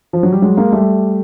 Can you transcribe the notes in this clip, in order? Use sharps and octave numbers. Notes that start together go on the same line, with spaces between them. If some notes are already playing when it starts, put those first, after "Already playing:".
F3
F#3
G3
F#3 G#3
G#3 A#3
G3 A3